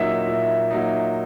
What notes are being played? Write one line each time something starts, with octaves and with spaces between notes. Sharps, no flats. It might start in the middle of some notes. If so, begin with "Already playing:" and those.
Already playing: A#2 F#3 A#3 D#4 E5
A#2
F#3 A#3 D#4